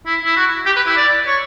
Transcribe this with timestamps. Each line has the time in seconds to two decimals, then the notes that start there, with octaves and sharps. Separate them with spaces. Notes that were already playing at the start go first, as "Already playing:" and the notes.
0.06 E4
0.25 E4
0.36 F#4
0.66 G4
0.76 B4
0.87 E4
0.97 D5
1.27 C#5